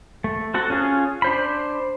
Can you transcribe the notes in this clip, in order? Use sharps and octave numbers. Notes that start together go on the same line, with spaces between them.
A3
C4 F#4 A4 F#5
C#4 F4 G#4
D4 C5 B5